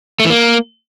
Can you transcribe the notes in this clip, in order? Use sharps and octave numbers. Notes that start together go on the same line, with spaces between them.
A3
E3
A#3